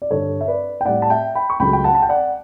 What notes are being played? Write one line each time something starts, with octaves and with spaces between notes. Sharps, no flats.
D5
G2 D3 G3 A4 C#5
E5
B4 D5
G5
A2 G3 D5 F#5
A5
E5 G5
G5 B5
C#6
C#2 C#3 F#3 A3 G5 B5
G5
F#5 A5
A5
G5
D5 F#5